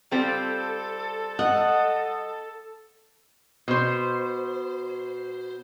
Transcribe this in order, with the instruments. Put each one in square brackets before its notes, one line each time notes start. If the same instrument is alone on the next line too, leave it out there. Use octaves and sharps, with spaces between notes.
[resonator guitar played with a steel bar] G3 C4 F4 [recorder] A4
[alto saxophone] D#5 [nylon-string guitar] F#5
[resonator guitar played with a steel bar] B2 C5